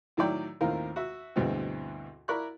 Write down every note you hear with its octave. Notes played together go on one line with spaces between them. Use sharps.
A2 D#3 F#3 E4 D5 G5
D#2 A2 D#3 C4 F4 A#4
F#4 E5
D2 G2 B2 E3 G#3 C4
E4 A#4 D5 B5 C#6 F#6